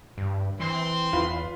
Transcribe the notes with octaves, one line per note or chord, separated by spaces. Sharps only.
G2
E3 C4 C6
E2 F4 B4